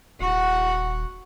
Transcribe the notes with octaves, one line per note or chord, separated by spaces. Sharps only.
D#1 F#4 F#5